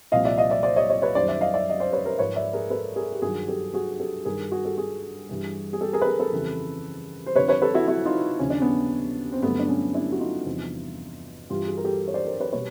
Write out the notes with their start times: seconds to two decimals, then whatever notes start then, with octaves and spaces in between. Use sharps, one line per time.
0.12 C2 A#2 F3 D#5 F5
0.25 D5 E5
0.37 D#5 F5
0.50 D5 E5
0.63 C5 D5
0.76 C#5 D#5
0.89 C#5 D#5
1.02 B4 C#5
1.15 F#2 D#3 G3 C5 D5
1.28 D5 E5
1.41 D#5 F5
1.54 D5 E5
1.70 D#5
1.80 C5 D5
1.93 B4 C#5
2.06 A#4 C5
2.19 G#2 F3 B4 C#5
2.36 D5 E5
2.53 G#4 A#4
2.70 A4 B4
2.96 G#4 A#4
3.12 G4
3.22 G2 D#3 F#3 F#4 G#4
3.48 G4 A4
3.74 F#4 G#4
3.99 G4 A4
4.25 G2 D#3 G3 G#4 A#4
4.52 F#4 G#4
4.65 G4 A4
4.77 F#4 G#4
5.29 G2 E3 G3
5.73 G#4
5.81 G4 A4
5.93 G#4 A#4
6.02 B4
6.06 G#4 A#4
6.19 A4 B4
6.32 F2 C#3 E3 G3
7.26 C5
7.36 F2 D3 F3 B4 C#5
7.48 B4 C#5
7.62 A4 B4
7.74 E4 F#4
7.88 E4 F#4
8.05 D#4 F4
8.39 D#2 C#3 F3 C#4
8.50 D4
8.61 B3 C#4
9.32 C4
9.42 G2 D3 F#3 A3 B3
9.59 D4
9.68 B3 C#4
9.94 D4 E4
10.12 F#4
10.20 D#4 F4
10.46 E2 C3 F3
11.50 G2 E3 G3 F4 G4
11.67 F#4 G#4
11.77 A#4
11.85 G4 A4
12.08 C#5
12.14 C5 D5
12.27 A#4 C5
12.40 B4 C#5
12.53 B2 G3 B4 C#5